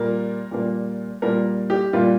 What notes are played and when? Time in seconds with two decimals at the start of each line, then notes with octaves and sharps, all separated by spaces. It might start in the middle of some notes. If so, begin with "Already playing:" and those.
Already playing: A#2 G3 A#3 A#4
0.51 A#2 G3 A#3
1.22 A#2 G3 A#3 A#4
1.70 G4
1.93 A#2 G3 A#3 F4